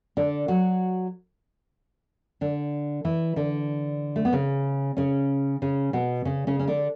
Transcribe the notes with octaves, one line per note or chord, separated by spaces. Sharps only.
D3 D4
F#3 F#4
D3 D4
E3 E4
D3 D4
A3
B3
C#3 C#4
C#3 C#4
C#3 C#4
B2 B3
C#3 C#4
C#3 C#4
C#4
D3 D4